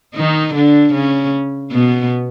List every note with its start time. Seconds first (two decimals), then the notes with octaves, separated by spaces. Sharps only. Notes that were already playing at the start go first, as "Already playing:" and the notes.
0.15 D#3 D#4
0.54 D3 D4
0.93 C#3 C#4
1.72 B2 B3